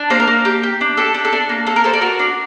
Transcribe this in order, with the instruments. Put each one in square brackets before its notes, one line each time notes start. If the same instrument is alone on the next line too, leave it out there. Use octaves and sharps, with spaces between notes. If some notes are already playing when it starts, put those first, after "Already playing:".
Already playing: [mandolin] D4
A#3 C5
A#4
A#3
G4
G4
D4
G4 A4
D4
A4
D4
A#3
A#3 A4
A#4
A4 C5
D5
F#4 A#4
D4